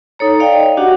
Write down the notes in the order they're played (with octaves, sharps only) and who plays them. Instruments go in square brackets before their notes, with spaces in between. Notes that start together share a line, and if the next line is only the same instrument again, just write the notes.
[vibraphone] D#4 A4 C#5 A#5
C#5 D5 F5 G5
D#5
D4 F#4 G4 F#5